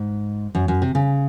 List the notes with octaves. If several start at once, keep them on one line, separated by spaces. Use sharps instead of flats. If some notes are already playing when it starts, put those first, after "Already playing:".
Already playing: G#2
F#2
F#2
C3
C#3